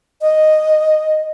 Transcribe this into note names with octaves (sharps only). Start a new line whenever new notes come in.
D#5